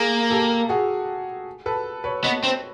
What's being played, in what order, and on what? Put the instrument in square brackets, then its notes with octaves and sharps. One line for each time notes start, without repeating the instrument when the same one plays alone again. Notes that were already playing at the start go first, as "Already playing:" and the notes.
Already playing: [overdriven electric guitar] A#3 [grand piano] G#4 A#4
[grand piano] G4 A4
F#4 G#4
A4 B4
B4 C#5
[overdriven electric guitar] B3 [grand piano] C#5 D#5
[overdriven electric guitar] C4